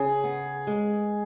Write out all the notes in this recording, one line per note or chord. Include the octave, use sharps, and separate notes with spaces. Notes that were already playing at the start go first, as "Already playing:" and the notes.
Already playing: C#3 G#4
B3
G#3